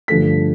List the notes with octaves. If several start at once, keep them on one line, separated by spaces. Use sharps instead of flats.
G2 D3 F3 A3 B6